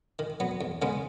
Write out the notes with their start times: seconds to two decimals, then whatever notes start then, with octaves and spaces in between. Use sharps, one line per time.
0.19 D#3
0.40 F#3 B3
0.61 E2
0.82 C#3 G#3 B3